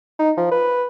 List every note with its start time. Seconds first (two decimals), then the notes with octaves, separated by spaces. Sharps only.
0.19 D#4
0.37 F3
0.51 B4